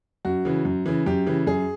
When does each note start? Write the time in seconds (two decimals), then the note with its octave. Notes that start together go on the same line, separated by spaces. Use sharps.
0.25 F#2 F#4
0.45 C#3 E3
0.65 F#2
0.86 C#3 E3
1.06 F#2 G4
1.27 C#3 E3
1.47 F#2 G#4